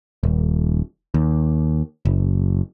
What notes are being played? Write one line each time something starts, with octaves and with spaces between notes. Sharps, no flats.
D#1
D#2
F#1